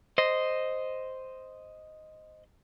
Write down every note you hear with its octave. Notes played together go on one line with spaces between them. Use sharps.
C5 D#5